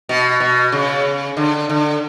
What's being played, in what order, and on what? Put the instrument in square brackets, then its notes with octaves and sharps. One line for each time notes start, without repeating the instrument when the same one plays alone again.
[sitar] B2
B2
C#3
D3
D3